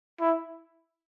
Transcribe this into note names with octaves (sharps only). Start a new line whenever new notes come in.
E4